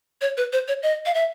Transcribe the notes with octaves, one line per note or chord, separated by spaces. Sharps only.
C#5
B4
C5
C#5
D#5
F5
E5